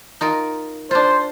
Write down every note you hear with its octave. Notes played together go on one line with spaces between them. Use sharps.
D#4 F4 A#4
D4 F4 C5